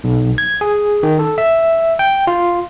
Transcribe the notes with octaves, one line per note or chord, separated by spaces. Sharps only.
B1
G#6
G#4
D#3
A4
E5
G5
F4